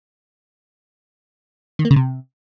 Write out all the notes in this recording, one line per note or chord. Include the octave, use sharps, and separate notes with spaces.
D#3
A#3
C#3
C3